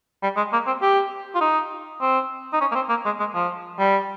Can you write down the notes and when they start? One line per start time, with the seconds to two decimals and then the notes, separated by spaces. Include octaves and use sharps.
0.23 G3
0.37 G#3
0.53 A#3
0.67 C4
0.82 G4
1.35 F4
1.41 D#4
2.01 C4
2.53 D#4
2.61 C#4
2.72 A#3
2.75 C4
2.90 A#3
3.06 G#3
3.20 G#3
3.35 F3
3.79 G3